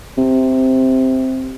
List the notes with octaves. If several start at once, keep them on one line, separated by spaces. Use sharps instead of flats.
C3